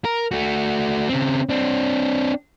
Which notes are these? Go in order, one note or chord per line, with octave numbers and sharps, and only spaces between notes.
A#4
A3 F#4
C#3 C4
C4 D4